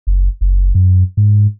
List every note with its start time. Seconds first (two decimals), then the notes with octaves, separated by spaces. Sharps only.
0.07 F#1
0.41 F#1
0.75 F#2
1.17 G#2